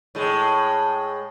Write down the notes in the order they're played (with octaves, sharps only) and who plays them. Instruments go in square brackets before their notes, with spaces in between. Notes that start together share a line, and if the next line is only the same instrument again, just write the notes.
[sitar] A2 G#3